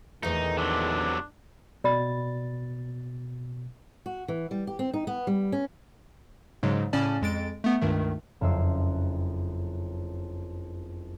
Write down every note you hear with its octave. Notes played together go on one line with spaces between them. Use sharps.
A#1 E2 D#3 A3 D#4 G#4
C3 F#3 D4
B2 D5 B5 A6
F#4
E3
G3
G4
C4
D#4
B3
G3
C#4
G#2 C#3 F#3 G#3
A2 C#3 C#4 D5 A5
F2 G#3 A6 D7
A3 B3
C#2 G2 D#3 A3
F#1 F2 E5 C6 E6